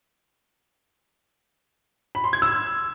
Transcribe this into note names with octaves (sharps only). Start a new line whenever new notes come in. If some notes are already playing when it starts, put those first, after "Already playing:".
B5
C6
G#6
E6